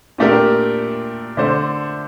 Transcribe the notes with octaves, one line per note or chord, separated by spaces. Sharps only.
A#2 A3 D4 G4 A#4
D3 A3 D4 A4 C5